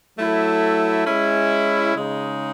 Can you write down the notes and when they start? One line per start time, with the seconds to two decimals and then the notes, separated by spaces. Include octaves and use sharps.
0.17 F#3 A3 E4 A4
1.06 G#3 C#4 E4
1.96 C#3 G#3 D#4